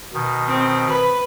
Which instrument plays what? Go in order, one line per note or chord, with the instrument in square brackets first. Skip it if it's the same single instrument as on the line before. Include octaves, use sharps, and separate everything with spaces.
[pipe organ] B2 D#3
[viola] C4
B4